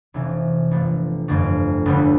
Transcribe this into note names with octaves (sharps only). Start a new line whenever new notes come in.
F1 F2 C3 E3
G1 G2 F3 A3
G1 F2 D3 A3
E1 E2 D3 G3